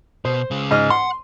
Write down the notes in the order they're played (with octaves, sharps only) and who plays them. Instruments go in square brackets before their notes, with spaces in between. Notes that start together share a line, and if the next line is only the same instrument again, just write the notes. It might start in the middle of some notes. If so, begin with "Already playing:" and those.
[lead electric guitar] B2 [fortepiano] C5
[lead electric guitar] C#3 G#3
[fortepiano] G#2 D#5 F6
[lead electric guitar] F#5 [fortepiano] C6